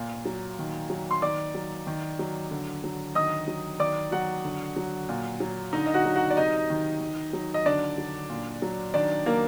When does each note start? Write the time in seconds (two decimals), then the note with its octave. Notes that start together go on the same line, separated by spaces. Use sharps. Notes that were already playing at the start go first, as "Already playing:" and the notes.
Already playing: A#2
0.25 F#3
0.59 D#3
0.90 F#3
1.11 C6
1.22 D#3 D5 D6
1.55 F#3
1.87 D#3
2.19 F#3
2.51 D3
2.84 F#3
3.15 D#3 D#5 D#6
3.48 F#3
3.80 D#3 D5 D6
4.11 F#3 F#4 F#5
4.45 D3
4.76 F#3
5.09 A#2
5.40 F#3
5.73 D3 D#4 D#5
5.86 D#5
5.94 F#4 F#5
6.05 F#3
6.16 F#4 F#5
6.30 D5
6.37 C3 D#4 D#5
6.70 D#3
7.01 D#3
7.33 F#3
7.54 D#5
7.66 D3 D4 D5
7.98 F#3
8.30 A#2
8.62 F#3
8.94 D#3 D4 D5
9.26 F#3 A#3 A#4